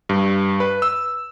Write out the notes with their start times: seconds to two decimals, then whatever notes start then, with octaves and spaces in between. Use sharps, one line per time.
0.09 G2
0.60 B4
0.82 E6